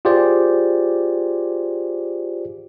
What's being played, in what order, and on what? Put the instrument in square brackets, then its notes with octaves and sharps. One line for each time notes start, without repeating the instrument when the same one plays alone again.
[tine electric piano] F4 G4 G#4 C5 D5